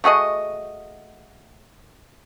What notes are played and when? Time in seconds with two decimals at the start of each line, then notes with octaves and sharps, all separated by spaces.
0.04 A3 F#4 G#4 D#5